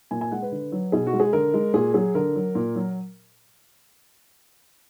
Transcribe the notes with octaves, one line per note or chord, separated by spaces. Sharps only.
A#2 G#5
G#5
G#3 F#5
B4
D3
F#3
B2 G#4
F#4
G#3
G#4
D3 A#4
G#3
A#2 G#4
F#3 G#4
D3 A#4
F#3
A#2
F#3